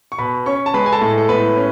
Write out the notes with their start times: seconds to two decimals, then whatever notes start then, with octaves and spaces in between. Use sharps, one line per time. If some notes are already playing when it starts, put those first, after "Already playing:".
0.12 C#6
0.18 B2 B4 B5
0.46 C#4 C#5 C#6
0.66 A5
0.74 G#3 B4 B5
0.86 G#5
0.93 A4 A5
1.01 A2
1.18 A4
1.29 A2 B3 B4
1.57 C#4